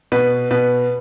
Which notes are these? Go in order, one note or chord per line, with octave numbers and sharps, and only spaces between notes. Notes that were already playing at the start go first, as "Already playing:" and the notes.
B2 B4
B2 B4